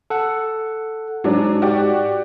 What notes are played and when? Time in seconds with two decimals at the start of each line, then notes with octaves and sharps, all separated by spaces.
0.10 A4 F#5
1.24 G#2 F#3 D4
1.62 F#4 G4 D5